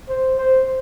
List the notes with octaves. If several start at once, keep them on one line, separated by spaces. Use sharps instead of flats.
C5
C5